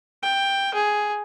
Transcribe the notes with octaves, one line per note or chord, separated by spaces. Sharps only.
G5
G#4